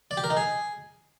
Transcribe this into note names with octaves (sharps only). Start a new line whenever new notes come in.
D5
G4
A#4
D#4
G#4